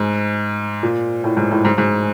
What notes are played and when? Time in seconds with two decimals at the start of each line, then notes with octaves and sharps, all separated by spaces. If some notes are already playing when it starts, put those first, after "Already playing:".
Already playing: G#2
0.83 A#2
1.24 A2
1.37 G#2
1.51 A2
1.65 G#2
1.78 G#2